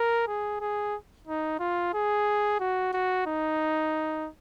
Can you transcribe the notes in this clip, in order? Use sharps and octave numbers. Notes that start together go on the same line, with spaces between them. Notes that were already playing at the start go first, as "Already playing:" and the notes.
Already playing: A#4
G#4
G#4
D#4
F4
G#4
F#4
F#4
D#4